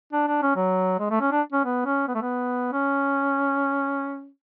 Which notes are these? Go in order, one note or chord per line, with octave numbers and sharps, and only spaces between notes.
D4
D4
C#4
F#3
G#3
A3
C#4
D4
C#4
B3
C#4
B3
A3
B3
C#4